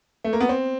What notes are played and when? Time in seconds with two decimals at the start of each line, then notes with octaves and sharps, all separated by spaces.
0.24 A3
0.33 A#3
0.41 B3
0.49 C4